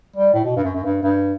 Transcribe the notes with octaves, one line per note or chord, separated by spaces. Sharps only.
G3
A2
B2
G2
F#2
F#2
G2
G2